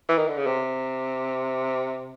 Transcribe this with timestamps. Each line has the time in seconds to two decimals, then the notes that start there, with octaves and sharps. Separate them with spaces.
0.09 E3
0.18 D#3
0.28 D3
0.37 C#3
0.46 C3